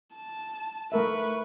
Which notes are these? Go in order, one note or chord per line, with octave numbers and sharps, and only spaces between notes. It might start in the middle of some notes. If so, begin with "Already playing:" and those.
A5
A3 A#4 B4 E5 C#6